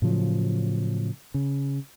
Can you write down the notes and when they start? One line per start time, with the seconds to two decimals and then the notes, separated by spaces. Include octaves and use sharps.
0.02 A2 C#3 F3 F#3
1.34 C#3